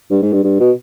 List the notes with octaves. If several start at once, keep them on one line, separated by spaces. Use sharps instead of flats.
G2
G#2
G2
G2
B2